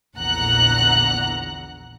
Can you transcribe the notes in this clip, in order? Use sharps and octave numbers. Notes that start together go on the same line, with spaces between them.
A#1 E2 D3 F#5 A#5 F#6